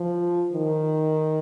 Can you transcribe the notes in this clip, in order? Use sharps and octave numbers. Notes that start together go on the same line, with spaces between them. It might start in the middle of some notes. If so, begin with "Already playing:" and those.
Already playing: F3
D#3